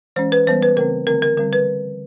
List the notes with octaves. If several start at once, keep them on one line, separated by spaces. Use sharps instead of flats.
E3 G#3 C#4 C5
B4
E3 G3 B3 C5
B4
C#3 E3 A3 C4 A#4
D3 F3 A3 C4 A#4
A#4
D3 G3 C4 A#4
B4